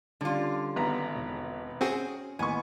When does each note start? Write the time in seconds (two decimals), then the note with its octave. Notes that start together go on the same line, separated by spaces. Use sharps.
0.21 D3 G3 C#4 F4
0.76 G#1 B3 A#5
1.15 E1 C#5 D#5
1.81 C4 C#4 F#4 G#4 C5
2.39 A1 D#3 A#3 B3 G#5 C#6